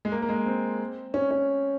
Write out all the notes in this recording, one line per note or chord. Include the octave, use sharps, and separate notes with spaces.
G#3
A#3
A#3
G#3
C4
C#4
C#4